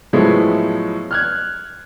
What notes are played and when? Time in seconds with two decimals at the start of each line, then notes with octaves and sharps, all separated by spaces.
0.13 A2 F3 F#3 G#3 A3 B3
1.11 F6 F#6 G#6